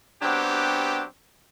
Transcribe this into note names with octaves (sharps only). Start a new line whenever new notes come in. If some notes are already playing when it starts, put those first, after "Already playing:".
F#3 B3 C4 D4 G4